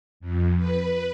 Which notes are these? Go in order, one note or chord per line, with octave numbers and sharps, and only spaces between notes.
F2
B4